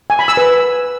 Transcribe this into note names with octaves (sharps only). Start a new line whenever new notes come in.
G#5
B5
E6
B4